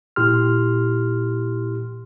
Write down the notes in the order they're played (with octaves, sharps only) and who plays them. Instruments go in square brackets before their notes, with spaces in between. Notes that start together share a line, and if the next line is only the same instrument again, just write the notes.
[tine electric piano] A#2 E4 G4 C6 F6